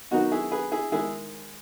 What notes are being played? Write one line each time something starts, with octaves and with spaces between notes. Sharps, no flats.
D#3 F#3 B3 D#4 F#4
E4 G#4
G#4 B4
E4 G#4
D#3 G#3 D#4 E4 G#4